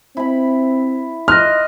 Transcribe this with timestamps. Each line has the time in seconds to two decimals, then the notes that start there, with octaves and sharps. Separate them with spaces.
0.17 C4 E4 B5
1.28 D#5 C6 F6 F#6 A#6